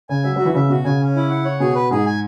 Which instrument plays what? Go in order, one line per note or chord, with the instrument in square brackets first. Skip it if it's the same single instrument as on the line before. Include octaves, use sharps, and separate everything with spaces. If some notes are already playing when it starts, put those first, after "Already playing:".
[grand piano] C#3 [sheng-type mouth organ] G#5
[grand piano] F#3 [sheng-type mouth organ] E5
[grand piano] F#3 [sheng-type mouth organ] F#4
[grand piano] E3
[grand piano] C#3 [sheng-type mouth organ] E5
[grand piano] B2 [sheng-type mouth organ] F#4
[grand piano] C#3 [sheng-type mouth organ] G#5
[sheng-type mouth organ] C#4
E4
F#5
C#5
[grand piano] B2 [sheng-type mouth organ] G#4
[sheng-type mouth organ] B4
[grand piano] G#2 [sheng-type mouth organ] G#4
[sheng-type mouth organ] G#5